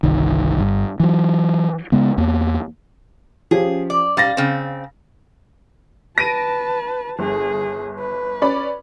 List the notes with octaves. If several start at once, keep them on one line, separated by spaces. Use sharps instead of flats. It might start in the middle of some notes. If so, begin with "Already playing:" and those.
G1 C2 D#3
G1 G2
E3 F#3
C#3 G#3 B3
E2 A#3
F3 C#4 G4 G#4
D5
G3 F5 A6 A#6
C#3 C4
B4 A5 A#6 D7 D#7
G1 G#4
B4
C#4 D5 B5